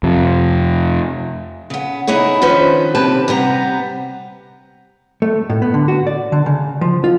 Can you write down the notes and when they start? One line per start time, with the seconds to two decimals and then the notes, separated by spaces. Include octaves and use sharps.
0.03 F2 C3
1.70 C#3 B3
2.07 B3 D#4 E4 G#4 C#5
2.42 D#3 F3 C#4 D4 B4 C5
2.94 D#2 C3 G4 B4 A5
3.28 C3 G3 B3 A#5
5.22 A3
5.50 A2
5.62 B3
5.74 D3
5.88 F#4
6.07 D5
6.32 D3
6.46 C#3
6.81 F3
7.04 F4